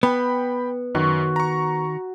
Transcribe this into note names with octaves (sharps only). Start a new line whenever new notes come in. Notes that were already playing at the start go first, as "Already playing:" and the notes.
B3 G5 B5
F#2 D#3 F#4
A#5 C#6